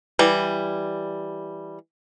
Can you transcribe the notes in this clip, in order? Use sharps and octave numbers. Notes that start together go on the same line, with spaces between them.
E3 G3